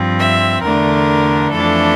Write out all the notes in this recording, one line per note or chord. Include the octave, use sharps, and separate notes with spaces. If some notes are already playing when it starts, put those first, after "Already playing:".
Already playing: G2 F3 C4
E5
E2 D3 A3 D4 A#4
F2 E3 A3 D4 A4